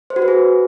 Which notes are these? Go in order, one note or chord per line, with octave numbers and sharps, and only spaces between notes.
C5
F#4
B4
G#4